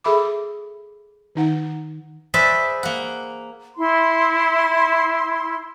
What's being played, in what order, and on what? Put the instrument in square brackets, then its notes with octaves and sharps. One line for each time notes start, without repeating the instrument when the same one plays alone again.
[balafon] G#4 A4 E5 B5 D6
D#3 D#4 F#5
[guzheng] G#4 B4 C5 D5 E5
A#3 F#5
[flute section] E4 C6